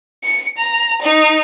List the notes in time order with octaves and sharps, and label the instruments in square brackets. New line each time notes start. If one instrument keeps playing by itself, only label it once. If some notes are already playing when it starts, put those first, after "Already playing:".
[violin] C#7
A#5
D#4